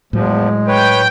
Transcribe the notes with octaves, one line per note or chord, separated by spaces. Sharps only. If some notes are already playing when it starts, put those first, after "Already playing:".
E2 A2 F3 F#3 G#3
B4 C#5 G5